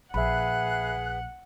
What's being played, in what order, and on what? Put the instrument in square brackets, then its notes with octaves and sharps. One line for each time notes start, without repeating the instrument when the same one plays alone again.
[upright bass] A#1 [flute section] G#4 B4 F#6 [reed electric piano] E5 B5 [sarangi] F#5